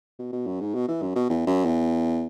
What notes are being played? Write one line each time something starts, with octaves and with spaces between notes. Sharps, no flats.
B2
B2
F#2
G#2
B2
E3
F#2
B2
E2
F#2
E2